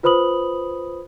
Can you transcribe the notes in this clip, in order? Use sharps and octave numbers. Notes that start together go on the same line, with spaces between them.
F4 B4 C5 B5 D#6 F#7